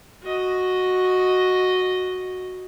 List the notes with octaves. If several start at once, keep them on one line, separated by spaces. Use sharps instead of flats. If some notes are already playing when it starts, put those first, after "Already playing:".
F#4 D#5